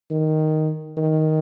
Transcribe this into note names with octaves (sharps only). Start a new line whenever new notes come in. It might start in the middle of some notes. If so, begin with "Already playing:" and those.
D#3
D#3